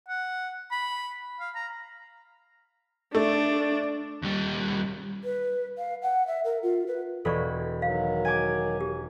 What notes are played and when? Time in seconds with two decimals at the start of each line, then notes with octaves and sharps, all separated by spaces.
0.09 F#5
0.71 B5
1.40 F5
1.55 A#5
3.15 A3 D4
4.22 D#2 G3
5.24 B4
5.78 F5
6.02 F#5
6.27 E5
6.44 A#4
6.63 F4
6.87 B4
7.25 E1 A4 D5 B5 C#6
7.82 D#3 F#3 F5
8.25 G#5 D6
8.81 G4